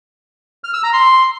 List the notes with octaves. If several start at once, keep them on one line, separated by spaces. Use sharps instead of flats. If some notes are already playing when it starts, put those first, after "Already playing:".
F6
E6
A#5
C6